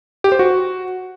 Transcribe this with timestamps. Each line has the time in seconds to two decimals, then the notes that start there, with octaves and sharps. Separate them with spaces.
0.24 G4
0.32 C5
0.39 F#4